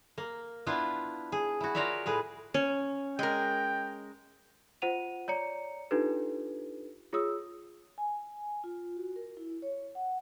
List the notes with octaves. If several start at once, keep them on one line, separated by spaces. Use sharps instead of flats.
A#3
B3 D4 E4 F4 B4
G#4
E4 F#4
F4 F#4 A#4 C#5 D5 E5
A2 G#4 B4
C#4
G#3 A#4 G5
F4 C5 F#5 D#7 F7
C#5 D5 A#5 C#7
D4 D#4 F4 G4 A4 B4
F4 G#4 C#5 D#6 E6
G#5
F4
F#4
A#4
E4
C#5
F#5